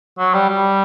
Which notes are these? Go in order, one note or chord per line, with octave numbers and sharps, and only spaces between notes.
F#3
G3
G3